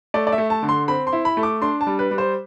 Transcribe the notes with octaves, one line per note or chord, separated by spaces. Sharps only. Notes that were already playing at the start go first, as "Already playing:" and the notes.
A3 D5
D5
E5
A3
A5
D3
C6
C4 B5
C6
E4
B5
A3
D6
D4 C6
A5
G3
B4
G3
C5